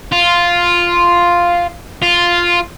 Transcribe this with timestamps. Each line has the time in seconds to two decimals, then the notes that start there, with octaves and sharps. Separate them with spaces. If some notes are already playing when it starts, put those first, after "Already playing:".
0.12 F4
2.03 F4